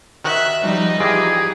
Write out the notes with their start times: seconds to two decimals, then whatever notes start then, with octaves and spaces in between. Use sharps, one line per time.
0.24 D#3 F#4 E5 F#6
0.63 F3 G3 D#4
1.00 E3 F4 G4 G#4 D5